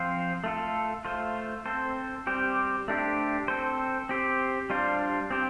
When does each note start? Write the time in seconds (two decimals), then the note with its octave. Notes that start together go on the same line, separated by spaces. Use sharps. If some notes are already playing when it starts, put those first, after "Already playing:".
Already playing: F3 C4 F4 C5
0.44 A3 F4 A4
1.05 A3 F4 C5
1.66 C4 A4 C5
2.27 G3 C4 G4 C5
2.88 A3 D4 G4 C5
3.48 C4 A4 C5
4.09 C4 G4 C5
4.70 G3 D4 F4 C5
5.31 C4 G4 C5